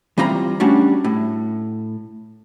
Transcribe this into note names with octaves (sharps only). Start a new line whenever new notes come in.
E3 G3 C4 F4 A#5 B5
G3 A3 C#4 D4 F#4
A2